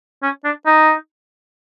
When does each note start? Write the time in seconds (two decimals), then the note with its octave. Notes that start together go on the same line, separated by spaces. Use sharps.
0.23 C#4
0.45 D4
0.66 D#4